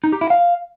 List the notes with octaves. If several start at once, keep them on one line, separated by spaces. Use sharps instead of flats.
D#4
G4
E4
F5